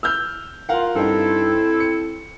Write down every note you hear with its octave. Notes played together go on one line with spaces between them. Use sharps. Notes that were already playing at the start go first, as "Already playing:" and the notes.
E6 F6 G6
F4 A#4 F5 F#5
G2 C4 D#4 E4 A4
C#7